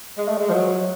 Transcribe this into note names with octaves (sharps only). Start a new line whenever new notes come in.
G#3
A3
G#3
F3
F#3